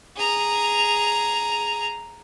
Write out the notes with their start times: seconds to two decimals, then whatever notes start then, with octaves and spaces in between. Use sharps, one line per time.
0.16 G#4 A#5